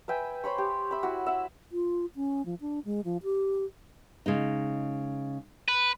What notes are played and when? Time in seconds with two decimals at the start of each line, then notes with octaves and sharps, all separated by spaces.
0.08 B4 E5 G5 G#5
0.44 C5 C#5 B5 C#6
0.58 G4
0.91 E5 B5
1.03 E4 F#4
1.26 E5 F#5
1.72 F4
2.16 C#4
2.46 F3
2.61 D4
2.85 G#3
3.04 F3
3.23 G4
4.26 C#3 G#3 D#4
5.68 B4